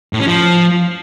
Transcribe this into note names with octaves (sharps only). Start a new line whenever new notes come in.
A2
C#4
F3